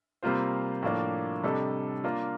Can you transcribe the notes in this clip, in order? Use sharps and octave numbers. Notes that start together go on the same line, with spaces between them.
C3 G3 A#3 F4 C5
A2 F3 A#3 D4
C3 G3 D4 A4 D#5
A#3 D4 F4